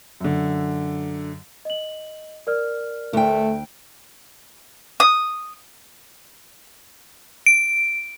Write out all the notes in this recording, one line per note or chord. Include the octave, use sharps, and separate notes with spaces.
F#2 D3
D#5 F#7
A#4 D5 F6
D2 A3 G5
D#6
D7